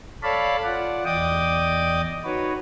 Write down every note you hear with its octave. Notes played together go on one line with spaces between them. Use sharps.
A4 C#5 D5 F5 A5 B5
F4 D5 F#5
E2 D5 D#5 G5 D6 D#6
D#4 F#4 B4 C#5